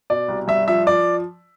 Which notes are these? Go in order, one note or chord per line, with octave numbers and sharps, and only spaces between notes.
B2 D5
C2
G2 E5
F3 E5
F3 D5